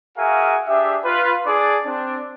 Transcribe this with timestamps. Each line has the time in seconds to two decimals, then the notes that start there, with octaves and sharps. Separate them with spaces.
0.17 F#4 G#4 A#4 E5 F5 G#5
0.67 D4 G4 G#4 E5
1.04 F4 B4
1.46 D4 G#4 D5
1.86 C4 D4